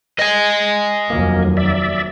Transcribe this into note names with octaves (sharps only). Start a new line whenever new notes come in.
D#5 G#5
F1 D#2 F#3 A#3
D5 E5